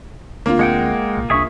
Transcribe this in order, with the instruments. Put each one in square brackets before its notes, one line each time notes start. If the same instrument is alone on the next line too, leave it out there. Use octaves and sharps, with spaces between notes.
[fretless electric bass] D2 C4 D4 [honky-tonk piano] A#3 F4
[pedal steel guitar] G#3 F#5 G5
[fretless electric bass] B1 A#2
[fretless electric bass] C2 D4 [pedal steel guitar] G#4 E5 C#6